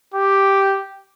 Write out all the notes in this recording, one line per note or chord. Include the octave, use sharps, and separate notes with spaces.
G4